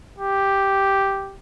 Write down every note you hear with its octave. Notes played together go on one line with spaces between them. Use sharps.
G4